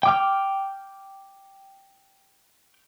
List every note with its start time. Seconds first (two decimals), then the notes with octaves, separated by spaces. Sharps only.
0.03 G5 D6 F6